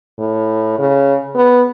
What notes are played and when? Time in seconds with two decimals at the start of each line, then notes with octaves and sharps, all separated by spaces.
0.19 A2
0.79 C#3
1.35 B3